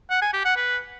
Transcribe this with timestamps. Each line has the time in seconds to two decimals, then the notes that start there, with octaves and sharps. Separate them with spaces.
0.10 F#5
0.22 G#5
0.33 G4
0.45 F#5
0.56 B4